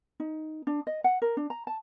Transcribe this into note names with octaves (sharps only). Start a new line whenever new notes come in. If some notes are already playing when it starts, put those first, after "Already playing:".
D#4
D4
D#5
F#5
A#4
D4
A#5
A5